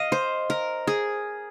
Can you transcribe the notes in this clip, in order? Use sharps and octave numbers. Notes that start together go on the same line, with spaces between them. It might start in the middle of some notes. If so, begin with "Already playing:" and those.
Already playing: D#5 F5
C5
A#4
G#4